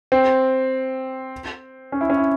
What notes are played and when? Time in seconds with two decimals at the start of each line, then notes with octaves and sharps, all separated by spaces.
0.12 C4
1.92 C#4
2.01 E4
2.10 C#4
2.17 E4